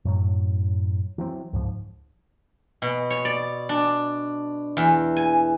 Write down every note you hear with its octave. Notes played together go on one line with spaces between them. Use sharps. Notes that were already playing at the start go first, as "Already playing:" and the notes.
F#2 A2 F#3
E3 F#3 C4
C#2 G#2 F3
B2
C#5
D5
D4
E2
G#5